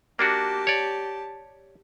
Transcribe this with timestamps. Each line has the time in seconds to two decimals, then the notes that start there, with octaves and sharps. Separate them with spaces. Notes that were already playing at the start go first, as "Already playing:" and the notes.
0.19 A#3 D4 F#4 G4 A5
0.67 C#5 D5